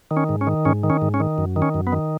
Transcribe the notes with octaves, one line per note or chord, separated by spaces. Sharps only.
D#3
C#4
G#2
C#4
D#3
G#2 C#4
D#3
C#4
G#2
C#4
D#3
F#2
D#3
C#4
F#2
B3
D#3